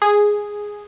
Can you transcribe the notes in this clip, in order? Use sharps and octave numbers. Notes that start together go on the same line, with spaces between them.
G#4